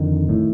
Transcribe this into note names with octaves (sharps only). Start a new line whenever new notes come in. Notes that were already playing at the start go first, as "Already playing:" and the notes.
Already playing: F2 D3 D#3
A2